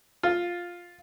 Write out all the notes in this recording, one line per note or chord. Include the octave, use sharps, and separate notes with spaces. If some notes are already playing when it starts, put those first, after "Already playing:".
F4